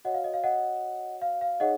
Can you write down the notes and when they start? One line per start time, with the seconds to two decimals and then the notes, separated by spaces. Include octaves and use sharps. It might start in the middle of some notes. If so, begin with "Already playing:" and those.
0.05 F#4 C#5 D#5 F#5
0.14 F5
0.24 D#5
0.34 F5
0.44 D#5 F#5
1.22 F5
1.41 F5
1.60 D#4 G#4 C#5 D#5 F#5